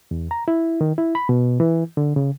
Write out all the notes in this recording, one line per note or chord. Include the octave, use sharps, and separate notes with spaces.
E2
A#5
E4
D#3
E4
B5
B2
E3
D3
C#3